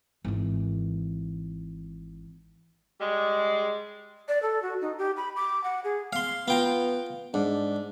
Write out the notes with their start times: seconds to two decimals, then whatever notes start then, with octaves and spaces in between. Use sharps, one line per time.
0.24 G#1 E3
3.00 G3 G#3
4.28 D5
4.43 A4
4.62 F#4
4.81 D#4
4.98 G4
5.17 B5
5.36 D6
5.64 F#5
5.84 G#4
6.13 F5 C6
6.48 B3 F4 G5 A#5
7.34 G#2 D4